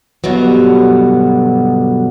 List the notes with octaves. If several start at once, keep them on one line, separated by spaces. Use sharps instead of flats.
G2 B2 D3 F#3